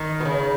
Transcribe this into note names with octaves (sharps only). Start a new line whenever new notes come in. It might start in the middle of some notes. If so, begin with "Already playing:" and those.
Already playing: D#3
B2
C#3